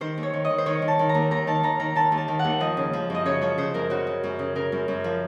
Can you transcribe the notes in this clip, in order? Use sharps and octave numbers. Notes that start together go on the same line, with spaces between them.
D#3 C5
D#2
C#5
D#3
D#5
D#3
C5
D#3 C#5
D#3
A5
D#3
A#5
D#2
D#2 A#5
D#3 A5
D#3 A#5
D#3 A#5
D#3 A5
D#2
A5
D#3
F#5
D#2
F3 D#5
C#3
F3
F#2 D#5
C#3 C#5
F3 C#5
C#3 C5
F#2 A#4
C#3 F#4
C#3
F#2
C#3
C#3 A#4
F#2
F#2
F3